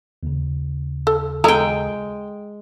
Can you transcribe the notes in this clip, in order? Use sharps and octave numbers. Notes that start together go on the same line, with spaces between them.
D#2 C#3
A4
G#3 A4 G5 A#5